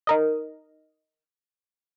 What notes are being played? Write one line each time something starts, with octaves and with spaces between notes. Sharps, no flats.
D#4 A#4 D#5